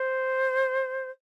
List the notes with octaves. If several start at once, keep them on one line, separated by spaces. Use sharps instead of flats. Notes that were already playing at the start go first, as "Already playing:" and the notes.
Already playing: C5